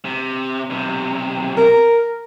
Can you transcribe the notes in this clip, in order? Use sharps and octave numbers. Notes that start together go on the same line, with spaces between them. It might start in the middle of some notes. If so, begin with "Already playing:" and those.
C3
B1 C3
A#4